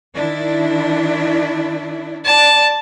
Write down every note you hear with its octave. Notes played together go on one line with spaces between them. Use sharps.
D#3 D4 E4
D5 A5